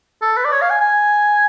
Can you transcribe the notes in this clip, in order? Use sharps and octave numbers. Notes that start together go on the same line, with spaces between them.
A4
B4
D5
C#5
F5
G#5
G#5